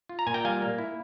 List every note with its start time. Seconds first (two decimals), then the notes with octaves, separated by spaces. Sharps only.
0.09 F4
0.19 A#5
0.27 A#2 G#5
0.34 G5 A#5
0.45 G3 F5 G#5
0.62 A#3
0.78 E4